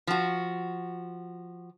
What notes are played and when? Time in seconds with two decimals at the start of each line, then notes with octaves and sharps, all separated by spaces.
0.07 F3 F#4